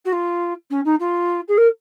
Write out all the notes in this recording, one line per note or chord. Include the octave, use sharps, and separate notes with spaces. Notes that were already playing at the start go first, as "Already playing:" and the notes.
F#4
F4
C#4
D#4
F4
G#4
A#4